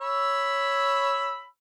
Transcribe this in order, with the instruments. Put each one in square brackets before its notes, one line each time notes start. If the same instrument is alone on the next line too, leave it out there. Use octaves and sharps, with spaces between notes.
[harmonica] C#5 B5 E6